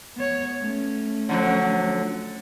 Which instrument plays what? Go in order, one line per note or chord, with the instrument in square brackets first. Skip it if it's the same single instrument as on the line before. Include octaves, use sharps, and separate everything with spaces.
[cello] B3 C#5
A3 C#4
[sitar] D3 F3 F#3